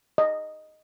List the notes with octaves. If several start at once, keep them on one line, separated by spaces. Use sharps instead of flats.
D#5